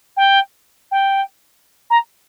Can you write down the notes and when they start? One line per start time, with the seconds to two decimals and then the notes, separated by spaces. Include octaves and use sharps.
0.17 G5
0.92 G5
1.90 A#5